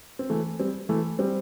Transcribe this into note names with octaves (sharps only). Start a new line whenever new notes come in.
C4
E3 A3
G3 C4
E3 A3
G3 C4